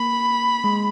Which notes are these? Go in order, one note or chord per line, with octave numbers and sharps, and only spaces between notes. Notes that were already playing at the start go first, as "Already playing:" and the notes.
Already playing: A#3 B5
G#3